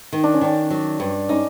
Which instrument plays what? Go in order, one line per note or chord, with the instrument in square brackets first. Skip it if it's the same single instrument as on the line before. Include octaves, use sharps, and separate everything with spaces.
[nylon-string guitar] D#3
[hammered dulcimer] D4
C#4
[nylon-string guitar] D#3 [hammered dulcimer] D4
[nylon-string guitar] F#3
G2
[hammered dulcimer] C#4 [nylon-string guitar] D#4